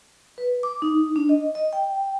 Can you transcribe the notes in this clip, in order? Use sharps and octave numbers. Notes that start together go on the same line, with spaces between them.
B4
D6
D#4
D4
D#5
D#5
G5